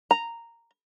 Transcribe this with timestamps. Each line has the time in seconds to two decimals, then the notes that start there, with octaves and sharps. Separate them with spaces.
0.11 A#5